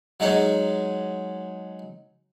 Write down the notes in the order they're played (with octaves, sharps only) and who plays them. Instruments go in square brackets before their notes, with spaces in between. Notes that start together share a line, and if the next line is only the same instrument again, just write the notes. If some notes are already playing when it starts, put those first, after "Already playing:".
[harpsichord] F#3 G#3 D#4 C#5